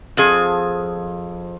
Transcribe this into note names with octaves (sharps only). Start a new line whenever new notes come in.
F2 F3 G#4